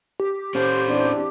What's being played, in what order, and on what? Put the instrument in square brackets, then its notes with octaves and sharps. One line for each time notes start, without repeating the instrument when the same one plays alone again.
[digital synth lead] G4
[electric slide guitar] C#4 A4 [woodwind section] C5
[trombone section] E2 C4 D4